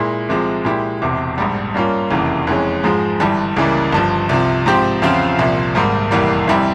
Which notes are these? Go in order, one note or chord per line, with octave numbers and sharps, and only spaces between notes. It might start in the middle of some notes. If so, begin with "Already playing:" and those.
Already playing: A#2 G#3 E4
C2 C3 F3 G#3
A#2 G#3 E4 G4
E1 E2 C3
A#1 G#2 G3
G2 G3 A#3 C#4 F4
F1 E2 C#3 E3 A#3
F2 E3 G#3 C#4
G#2 F3 G#3
G1 G2 E3 G3
C#2 C#3 E3 G3 A#3
G1 G2 F3
C2 C3 F3
G#2 F3 C4 G4
E2 C#3 F3 C4 F4
C2 A#2 F3
G#1 G#2 G3 A#3
F1 E2 E3 G3 A#3
F2 C3 E3 G3 C4